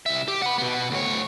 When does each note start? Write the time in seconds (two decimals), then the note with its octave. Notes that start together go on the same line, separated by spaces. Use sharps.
0.06 C2 E5
0.28 G4
0.42 F#5 B5
0.58 B2 B3
0.91 D2 C#5